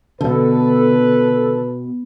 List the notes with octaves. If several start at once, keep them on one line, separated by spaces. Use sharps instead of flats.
B2 D3 A4 B4